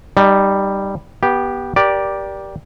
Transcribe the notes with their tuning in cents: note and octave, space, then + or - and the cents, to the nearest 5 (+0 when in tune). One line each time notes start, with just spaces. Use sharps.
G3 +0 D#4 -20
B3 -20 G4 +0
G4 +0 A#4 +35 D5 +0